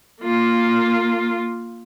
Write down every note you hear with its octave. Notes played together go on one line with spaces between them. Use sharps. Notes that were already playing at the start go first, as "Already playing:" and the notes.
A#3 F4